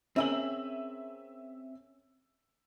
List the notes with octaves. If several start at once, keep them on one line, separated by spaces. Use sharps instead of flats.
C4 C#4 G#4 A#4 E5 E6 F#7